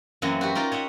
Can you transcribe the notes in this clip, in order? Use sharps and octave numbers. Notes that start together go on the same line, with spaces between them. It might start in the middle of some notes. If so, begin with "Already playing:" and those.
F#2 E3 A#3 C4 D#5 F#5
F#4 G4 B4
D#4 F4 A#4 D5 D#5
C#5 D#5 E5 F#5